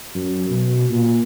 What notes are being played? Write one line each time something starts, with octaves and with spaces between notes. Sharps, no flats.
F#2
B2
A#2